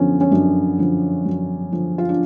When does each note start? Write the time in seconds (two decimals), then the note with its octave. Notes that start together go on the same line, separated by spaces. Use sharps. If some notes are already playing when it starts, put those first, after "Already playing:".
Already playing: F#2 D3 F3 B3 C#4
0.21 C#4
0.31 F#2 D4
0.78 D3 F3
1.25 F#2
1.72 D3 F3
1.98 F4
2.09 D4